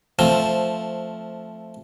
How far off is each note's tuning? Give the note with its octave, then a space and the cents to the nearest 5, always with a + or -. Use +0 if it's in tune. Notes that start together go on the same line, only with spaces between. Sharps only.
F3 +0 A3 +0 C4 +10